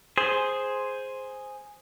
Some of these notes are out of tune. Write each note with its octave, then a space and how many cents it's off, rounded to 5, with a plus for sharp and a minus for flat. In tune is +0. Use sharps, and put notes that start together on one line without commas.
G#4 +0 C5 +0